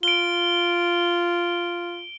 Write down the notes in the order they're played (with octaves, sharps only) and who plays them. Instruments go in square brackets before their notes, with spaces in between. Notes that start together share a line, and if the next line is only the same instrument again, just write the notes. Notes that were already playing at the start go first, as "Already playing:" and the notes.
[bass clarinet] F4 [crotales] D7 G7